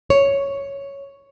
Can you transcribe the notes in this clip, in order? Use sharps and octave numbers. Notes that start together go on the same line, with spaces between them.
C#5